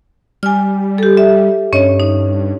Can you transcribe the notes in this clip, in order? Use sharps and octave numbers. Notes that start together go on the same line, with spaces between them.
G3 G#5 F6
G4 A4
E5
G2 C#4 C#5 D#5
D#4